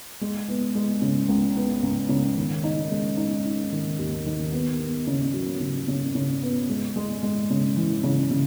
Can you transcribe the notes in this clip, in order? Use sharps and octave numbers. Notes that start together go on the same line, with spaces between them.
G#3
B3
G#3
C#3
C#2
B3
C#2
C#3
D#3
D#4
G#3
D#4
D#4
D#3
D#2
D#3
B3
B3
C#3
F#3
C#3
C#3
C#3
B3
G#3
G#3
G#3
C#3
E3
C#3
C#3